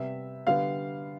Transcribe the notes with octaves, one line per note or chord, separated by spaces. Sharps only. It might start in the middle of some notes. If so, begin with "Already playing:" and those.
Already playing: C3 G3 B3 E5
D3 G3 B3 F5